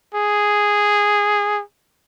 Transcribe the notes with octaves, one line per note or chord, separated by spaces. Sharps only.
G#4